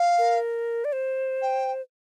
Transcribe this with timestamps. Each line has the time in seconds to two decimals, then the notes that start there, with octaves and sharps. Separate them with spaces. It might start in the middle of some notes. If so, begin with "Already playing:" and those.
Already playing: F5
0.18 A#4
0.85 D5
0.92 C5
1.42 G5